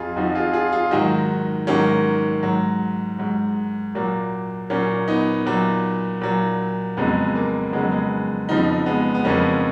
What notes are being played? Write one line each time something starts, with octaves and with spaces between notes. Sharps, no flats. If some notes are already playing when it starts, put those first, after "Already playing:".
Already playing: F2 F3 F4 G#4
F2 F3 D#4 F#4
F4 G#4
F4 G#4
F4 G#4
G#2 D#3 F#3 D#4 F#4
G#2 D#3 F#3 A#3 C#4
G#2 F#3
G#2 F#3
A#2 F#3 A#3
A#2 F#3 A#3 C#4
B3 D#4
A#2 F#3
A#2 F#3
F2 C#3 F#3 G#3 B3
A#3
F2 C#3 F#3 G#3 B3
G#3 B3
F2 C#3 F3 B3 D#4
G#3 B3
B3
F2 C#3 F3 A#3 C#4